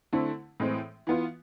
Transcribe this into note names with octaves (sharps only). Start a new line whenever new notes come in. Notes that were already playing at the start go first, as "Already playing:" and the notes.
D3 A3 C4 E4
A2 E3 G#3 C4
E3 B3 F4